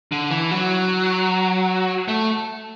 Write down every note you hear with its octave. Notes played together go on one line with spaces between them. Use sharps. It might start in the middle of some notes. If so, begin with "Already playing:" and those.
D3
E3
F#3
A3